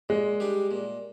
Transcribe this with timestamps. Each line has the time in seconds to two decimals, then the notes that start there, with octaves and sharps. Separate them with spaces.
0.09 A#2 G#3
0.40 G3 D4 G4
0.71 A#2